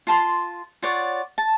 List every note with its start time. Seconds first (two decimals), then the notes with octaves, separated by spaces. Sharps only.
0.07 F4 A5 C6
0.82 F4 C#5 D5 F#5
1.38 A5